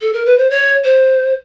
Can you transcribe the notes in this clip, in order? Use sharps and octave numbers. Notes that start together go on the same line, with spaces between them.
A4
A#4
B4
C5
C#5
C5